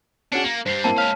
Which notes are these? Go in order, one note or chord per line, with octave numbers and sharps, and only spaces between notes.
C#4 D4 F#4 G#4 C#7
A#3 F#7
G2 G3 C5 C7
A#3 C4 E4 A5
G#3 C#5 F5 F6 B6